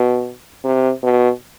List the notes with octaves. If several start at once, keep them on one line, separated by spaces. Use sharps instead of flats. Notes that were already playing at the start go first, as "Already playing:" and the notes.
Already playing: B2
C3
B2